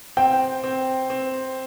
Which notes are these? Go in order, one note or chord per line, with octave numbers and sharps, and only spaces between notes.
C4 G5
C4
C4